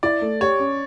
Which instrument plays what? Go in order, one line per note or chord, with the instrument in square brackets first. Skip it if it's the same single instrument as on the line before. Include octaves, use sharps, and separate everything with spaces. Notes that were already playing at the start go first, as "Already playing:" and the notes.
[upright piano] E4 [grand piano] D5
[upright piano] A3
[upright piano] G4 [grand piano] C#5
[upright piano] C#4